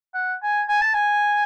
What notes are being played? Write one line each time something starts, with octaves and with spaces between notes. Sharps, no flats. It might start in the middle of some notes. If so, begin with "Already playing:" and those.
F#5
G#5
G#5
A5
G#5